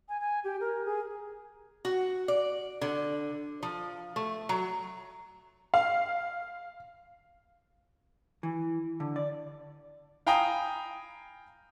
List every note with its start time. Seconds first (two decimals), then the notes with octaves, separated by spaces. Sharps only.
0.08 G#5
0.20 G#5
0.44 G4
0.60 A#4
0.85 G#4
1.85 F#4
2.28 D5
2.81 D3
3.63 F3
4.16 A3
4.49 F#3
5.74 F5
8.43 E3
9.00 D3
9.16 D5
10.27 F5 G5 G#5 A#5 B5 D#6